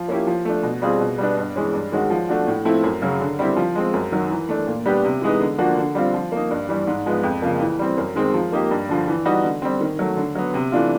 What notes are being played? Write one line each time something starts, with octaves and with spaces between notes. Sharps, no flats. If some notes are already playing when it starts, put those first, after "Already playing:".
Already playing: F3
A#3 C#4 E4 G4
F3
A3 D4
B2
G3 C4 F4 G#4
B2
G3 B3 D4
G2
E3 G#3 C#4
G2
D#3 G#3 C#4 F#4
F3
A3 D4 F#4
A2
F3 A3 C4 E4
F#2
C#3 F#3
D3
G3 C4 E4 G4
F3
G#3 C4
F#2
D#3 F#3
E3
A3 D4
A#2
G3 B3 D4 G4
C3
E3 G#3 B3 D#4
D3
F3 A#3 D4 F#4
D3
G3 C4 F4
F3
A#3 D#4
G2
E3 G3
G#2
F3 G#3 B3
F2
C#3 F3 A#3
E3
G3 C4
F#2
D#3 G#3 C4
F3
A#3 D#4 G4
G2
D3 F3
E3
G3 B3 D#4 F#4
D3
G3 C4
D#3
F#3 A3
D3
F#3 B3
C3
E3 A3 D4 F4